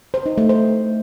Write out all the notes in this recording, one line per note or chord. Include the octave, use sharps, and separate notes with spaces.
C5
D#4
A3
C5